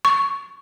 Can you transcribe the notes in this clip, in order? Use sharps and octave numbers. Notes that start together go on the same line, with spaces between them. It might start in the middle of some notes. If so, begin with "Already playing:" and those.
C#6